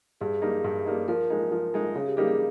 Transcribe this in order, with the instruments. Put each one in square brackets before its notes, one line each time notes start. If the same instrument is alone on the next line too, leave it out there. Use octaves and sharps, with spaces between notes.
[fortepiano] G2 [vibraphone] G#4
[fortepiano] G3 A#3 D#4
G2
G3 A#3 D#4
[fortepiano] F3 [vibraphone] A#4
[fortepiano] G#3 D#4
F3
G#3 D#4
[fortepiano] C#3 [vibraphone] G#4
[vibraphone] G4
[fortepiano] G3 A#3 D#4 G4 [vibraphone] G#4
[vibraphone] G#4